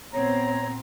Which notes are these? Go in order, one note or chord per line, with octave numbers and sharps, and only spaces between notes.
A#2 B3 C4 C#5 A#5